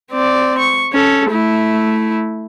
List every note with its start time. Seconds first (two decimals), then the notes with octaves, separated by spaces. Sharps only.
0.11 C4 D5
0.58 C#6
0.93 C#4 A4
1.30 A3 E4